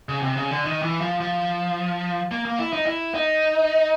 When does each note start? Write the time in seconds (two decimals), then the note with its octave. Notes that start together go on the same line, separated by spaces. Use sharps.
0.09 C#3
0.22 C3
0.37 C#3
0.51 D3
0.65 D#3
0.82 E3
1.01 F3
1.20 F3
2.31 A#3
2.45 A#3
2.59 E4
2.73 D#4
2.86 E4
3.14 D#4